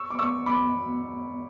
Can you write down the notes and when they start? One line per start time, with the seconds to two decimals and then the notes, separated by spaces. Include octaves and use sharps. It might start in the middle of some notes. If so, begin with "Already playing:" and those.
Already playing: C#6 E6
0.10 D6
0.19 C#6 E6
0.46 B5 D6